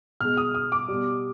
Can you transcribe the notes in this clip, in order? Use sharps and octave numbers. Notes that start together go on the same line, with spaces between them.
B2 G#3 F6
D#6
D#6
D6
B2 G3